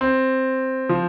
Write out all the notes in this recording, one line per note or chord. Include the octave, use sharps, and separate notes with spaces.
C4
F3